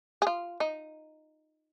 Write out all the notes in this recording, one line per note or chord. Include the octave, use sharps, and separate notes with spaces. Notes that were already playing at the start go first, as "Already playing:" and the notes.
G#4
F4
D#4